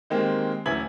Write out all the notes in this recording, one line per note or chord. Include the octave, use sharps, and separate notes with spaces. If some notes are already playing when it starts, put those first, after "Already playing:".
D#3 G#3 A#3 C4 G4
D1 E3 C#4 E5 G#6 F#7